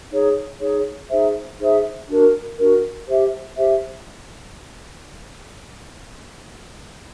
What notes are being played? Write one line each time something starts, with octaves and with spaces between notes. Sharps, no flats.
D#4 G#4 C#5
D#4 G#4 C#5
D#4 G#4 C5 E5
D#4 G#4 C5 E5
D4 F#4 A#4
D4 F#4 A#4
G4 C5 E5
G4 C5 E5